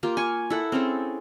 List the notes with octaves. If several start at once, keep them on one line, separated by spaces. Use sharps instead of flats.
A#3 F4 G4
G#5 C#6
E4 A4 F#5
C4 C#4 G#4 A4